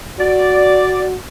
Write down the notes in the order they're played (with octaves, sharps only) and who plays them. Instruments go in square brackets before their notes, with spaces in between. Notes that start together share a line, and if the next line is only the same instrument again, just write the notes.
[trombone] F#4 [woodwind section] D5